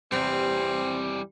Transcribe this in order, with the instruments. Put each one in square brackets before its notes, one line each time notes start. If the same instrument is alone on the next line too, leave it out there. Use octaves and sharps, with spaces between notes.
[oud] E2 C3 [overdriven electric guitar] E3 G3 [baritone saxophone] C4